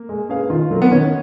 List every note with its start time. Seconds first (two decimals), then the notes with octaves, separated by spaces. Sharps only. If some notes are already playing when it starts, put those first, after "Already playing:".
Already playing: A#3
0.09 G#3
0.29 C#4 G#4 B4 F5
0.50 D#3 F4
0.71 F#3 A#3 F4
0.82 B3
0.91 D#3 C#4